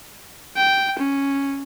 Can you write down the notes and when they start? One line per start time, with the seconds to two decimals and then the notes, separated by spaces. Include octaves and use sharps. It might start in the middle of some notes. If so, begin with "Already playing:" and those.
0.56 G5
0.99 C#4